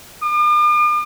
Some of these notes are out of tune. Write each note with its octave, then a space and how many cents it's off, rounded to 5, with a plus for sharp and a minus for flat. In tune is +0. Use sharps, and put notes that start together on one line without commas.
D6 +45